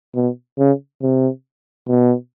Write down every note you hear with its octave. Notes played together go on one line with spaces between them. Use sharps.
B2
C#3
C3
B2